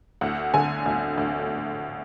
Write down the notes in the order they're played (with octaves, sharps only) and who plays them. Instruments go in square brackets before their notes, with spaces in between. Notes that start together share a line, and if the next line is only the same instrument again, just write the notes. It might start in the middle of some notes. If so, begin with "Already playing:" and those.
[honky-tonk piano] D2 F#5
D3 G#5
D2
D2